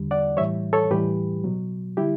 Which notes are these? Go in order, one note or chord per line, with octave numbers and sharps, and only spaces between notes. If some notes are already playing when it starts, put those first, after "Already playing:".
Already playing: E2 D3 G3
D5 F#5
A2 E3 G3 C#5 E5
A4 C#5
A2 E3 G3 G4 B4
B2 F#3
D3 G3 E4 G4